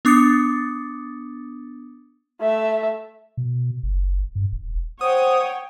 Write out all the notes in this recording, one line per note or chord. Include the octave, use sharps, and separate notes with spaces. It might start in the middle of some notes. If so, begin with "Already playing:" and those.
B3 D4 D6 D#6 A6 C#7
A3 E5
B2
F#1
G2
E1
C5 C#5 F#5 G5 D#6